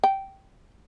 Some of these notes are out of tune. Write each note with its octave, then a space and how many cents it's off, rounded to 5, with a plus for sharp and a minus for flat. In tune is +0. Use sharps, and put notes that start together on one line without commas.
G5 -15